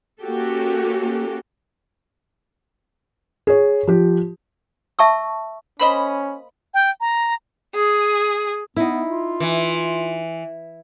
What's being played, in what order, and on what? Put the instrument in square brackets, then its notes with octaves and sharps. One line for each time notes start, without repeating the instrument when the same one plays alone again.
[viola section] A#3 C#4 F#4 G4 A4
[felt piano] G#4 C#5
F3 G4
[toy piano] E5 A5 C#6 E6
[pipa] A#3 C5 D#5 [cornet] C#4 [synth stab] B5
[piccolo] G5
A#5
[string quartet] G#4
[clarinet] B3 [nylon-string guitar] D#4 E4
[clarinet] F4
[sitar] E3